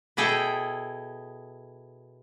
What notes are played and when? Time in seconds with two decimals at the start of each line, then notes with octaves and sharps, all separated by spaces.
0.17 B2 E4 G#4 A4 G5